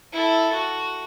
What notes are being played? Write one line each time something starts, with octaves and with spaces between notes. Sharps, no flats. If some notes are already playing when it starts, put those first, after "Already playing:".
E4 A4
F#4